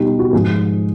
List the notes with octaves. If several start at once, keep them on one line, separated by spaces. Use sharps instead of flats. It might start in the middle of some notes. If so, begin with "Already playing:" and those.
Already playing: B2 G3 D#4 G4
F#4
G#2 F3 G#4